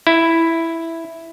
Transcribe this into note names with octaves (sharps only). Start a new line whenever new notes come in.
E4